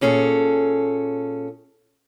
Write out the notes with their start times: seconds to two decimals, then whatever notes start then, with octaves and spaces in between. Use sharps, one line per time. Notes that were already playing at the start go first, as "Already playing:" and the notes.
0.01 A#2 C#4 G#4 A4